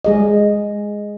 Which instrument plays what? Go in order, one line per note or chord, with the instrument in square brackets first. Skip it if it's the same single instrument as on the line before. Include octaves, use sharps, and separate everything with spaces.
[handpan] G#3 G#4 D#5